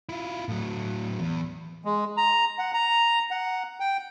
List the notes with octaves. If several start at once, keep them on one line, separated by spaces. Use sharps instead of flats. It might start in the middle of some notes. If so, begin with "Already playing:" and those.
E4 F4
A2 F#3
E2
G#3
A#5
F#5
A#5
F#5
G5